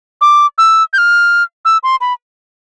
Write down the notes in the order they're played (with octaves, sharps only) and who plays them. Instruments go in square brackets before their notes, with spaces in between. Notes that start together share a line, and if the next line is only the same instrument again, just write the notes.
[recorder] D6
E6
G6
F6
E6
C6
B5